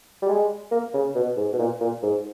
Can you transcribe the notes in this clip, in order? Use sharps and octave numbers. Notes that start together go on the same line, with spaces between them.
G3
G#3
A#3
C#3
B2
G#2
B2
A#2
A#2
G#2